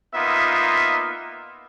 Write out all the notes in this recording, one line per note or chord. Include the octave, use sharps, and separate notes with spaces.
A#3 B3 D#4 F4 E5